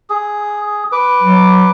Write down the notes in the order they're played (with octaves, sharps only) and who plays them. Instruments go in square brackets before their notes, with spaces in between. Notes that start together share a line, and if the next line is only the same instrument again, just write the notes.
[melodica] G#4
B4 D6
[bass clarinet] F#3